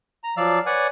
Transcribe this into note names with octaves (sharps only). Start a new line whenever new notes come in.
A#5
F3 F#3 D5 F5 E6
B4 C#5 D5 F#5 G#5